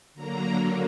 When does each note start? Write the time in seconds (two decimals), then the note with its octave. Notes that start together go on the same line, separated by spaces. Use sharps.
0.14 D3 F#3 A#3 A#5